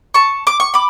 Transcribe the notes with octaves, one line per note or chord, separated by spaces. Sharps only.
A5 C#6
D6
C#6
B5 D6